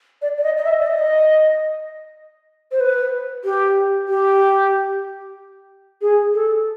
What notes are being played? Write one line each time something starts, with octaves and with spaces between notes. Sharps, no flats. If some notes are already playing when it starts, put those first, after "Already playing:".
D5
D5
D#5
D#5
E5
D5
D#5
C5
B4
G4
G4
G#4
A4